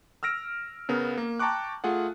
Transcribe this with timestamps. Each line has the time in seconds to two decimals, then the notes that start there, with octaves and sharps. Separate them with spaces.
0.23 E6 F6 A#6 D7
0.89 C#3 B3 A#4
1.18 A#3
1.39 G5 A5 A#5 C#6 D6 F#6
1.84 A3 F4 G#4 F#5